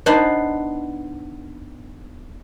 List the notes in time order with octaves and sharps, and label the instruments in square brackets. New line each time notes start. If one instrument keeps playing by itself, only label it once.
[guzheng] B3 D4 D#4 C5